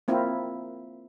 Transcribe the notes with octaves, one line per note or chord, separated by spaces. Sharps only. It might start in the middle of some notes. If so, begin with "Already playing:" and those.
A#3 C4 E4 F4 A#4